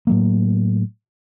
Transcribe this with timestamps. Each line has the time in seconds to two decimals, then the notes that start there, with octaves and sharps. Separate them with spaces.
0.07 A2 F#3 A#3